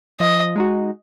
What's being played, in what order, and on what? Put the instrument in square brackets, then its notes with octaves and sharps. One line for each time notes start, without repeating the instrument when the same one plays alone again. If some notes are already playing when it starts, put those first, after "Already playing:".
[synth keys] F3 [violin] D#5
[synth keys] G#3 D#4 F#4